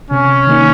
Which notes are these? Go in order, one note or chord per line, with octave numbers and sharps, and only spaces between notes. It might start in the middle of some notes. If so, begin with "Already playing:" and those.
C3 C#4
D#3 A#3 D#4